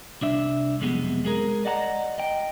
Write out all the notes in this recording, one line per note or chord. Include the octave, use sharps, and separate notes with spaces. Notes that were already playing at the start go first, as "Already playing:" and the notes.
C2 D4 E5
B1 F2 C3 G#3 B3
G#3 G#4 A#4
D5 D#5 F#5 A5 A#5
D#5 G5